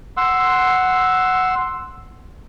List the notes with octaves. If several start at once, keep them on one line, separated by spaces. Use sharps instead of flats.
F#5 C6 E6